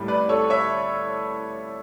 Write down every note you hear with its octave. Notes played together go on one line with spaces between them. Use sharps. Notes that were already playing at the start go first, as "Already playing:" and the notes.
Already playing: A2 G3
B4 D5
A4 C#5
C#5 E5